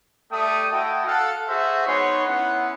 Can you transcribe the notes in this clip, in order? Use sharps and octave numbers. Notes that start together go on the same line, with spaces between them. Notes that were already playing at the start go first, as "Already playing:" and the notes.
G3 A3 G5 D#6
A3 E4 F#4 A4 D#5 G5
A4 F5 F#5
F#4 G#4 C5 E5
G#3 B3 D#4 C#5 C6 C#6
B3 C#4 E4 F#5